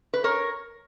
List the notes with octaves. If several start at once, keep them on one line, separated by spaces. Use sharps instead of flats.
B4
A#4 C#5